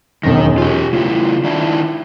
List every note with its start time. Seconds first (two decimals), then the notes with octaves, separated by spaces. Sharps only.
0.23 E1 F#2 D#3 A#6
0.58 F4 G4
0.93 A2 C#3 E4 F4
1.44 D#3 D4 E4